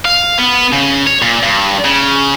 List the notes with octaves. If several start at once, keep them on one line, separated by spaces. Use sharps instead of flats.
F5
B3
C#3
C#5
A#2
G2
C#3